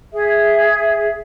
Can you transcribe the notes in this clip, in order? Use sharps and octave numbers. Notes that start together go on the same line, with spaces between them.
G#4 E5